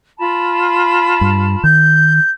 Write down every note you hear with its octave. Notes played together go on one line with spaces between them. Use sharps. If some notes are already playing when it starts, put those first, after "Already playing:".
F4 A5 B5
G2
D#3 G6